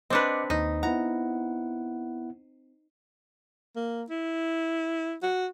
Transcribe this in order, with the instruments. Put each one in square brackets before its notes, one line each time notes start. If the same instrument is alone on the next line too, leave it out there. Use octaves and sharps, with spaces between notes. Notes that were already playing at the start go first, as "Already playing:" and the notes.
[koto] C4 D4 B4 [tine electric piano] D#5 D6 C#7
[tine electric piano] D#2 [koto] D#4
[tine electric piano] B3 E4 F#5 [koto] A#5
[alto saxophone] A#3
E4
F#4